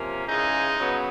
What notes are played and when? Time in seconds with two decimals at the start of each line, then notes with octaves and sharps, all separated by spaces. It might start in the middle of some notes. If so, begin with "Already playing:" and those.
Already playing: C3 F3 A#3 C#4
0.26 C#3 E3 G#3 D#4
0.77 C#3 F#3 B3